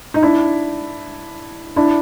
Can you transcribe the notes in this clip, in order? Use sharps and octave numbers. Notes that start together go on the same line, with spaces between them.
D#4
D4 E4
D4 E4